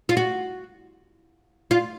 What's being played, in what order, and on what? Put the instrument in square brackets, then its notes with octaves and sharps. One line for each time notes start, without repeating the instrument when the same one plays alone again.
[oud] F4
F#4
F4